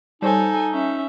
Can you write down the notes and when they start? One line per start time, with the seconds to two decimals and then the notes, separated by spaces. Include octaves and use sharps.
0.22 G3 D#4 A4 C5 C#5 G#5
0.73 C#4 E5